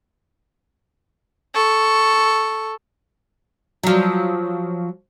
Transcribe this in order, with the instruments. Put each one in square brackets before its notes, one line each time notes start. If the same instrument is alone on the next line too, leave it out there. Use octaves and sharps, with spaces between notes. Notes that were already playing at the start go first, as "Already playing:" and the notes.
[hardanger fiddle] A4 C#6
[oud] F3 F#3